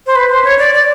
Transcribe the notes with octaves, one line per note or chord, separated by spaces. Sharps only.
C5
B4
C5
C#5
D5
D5